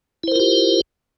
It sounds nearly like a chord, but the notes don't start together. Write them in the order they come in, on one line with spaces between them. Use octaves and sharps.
E4 C5 A#4 F4 G4